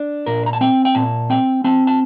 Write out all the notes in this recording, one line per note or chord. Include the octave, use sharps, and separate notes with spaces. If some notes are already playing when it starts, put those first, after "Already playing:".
Already playing: D4
A#2 A#4
A#5
A5
C4 G5
G5
A#2 A5
C4 G5
C4 A5
A5